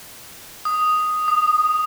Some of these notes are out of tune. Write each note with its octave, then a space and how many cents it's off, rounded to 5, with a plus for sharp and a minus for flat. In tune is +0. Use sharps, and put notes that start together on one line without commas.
D#6 +0
D#6 -30